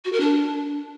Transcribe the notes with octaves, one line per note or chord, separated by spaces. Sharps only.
F#4
A#4
D4